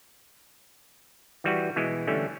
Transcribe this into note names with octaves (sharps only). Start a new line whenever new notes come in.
E3 G3 F#4 B4
B2 E3 G#3
D3 E3 G3 A3 C#4